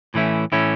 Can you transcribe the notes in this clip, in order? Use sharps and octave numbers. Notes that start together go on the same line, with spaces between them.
A2 E3 A3 C#4 E4
A2 E3 A3 C#4 E4